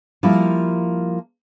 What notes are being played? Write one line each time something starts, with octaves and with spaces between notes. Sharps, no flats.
F3 G3 A#3 E4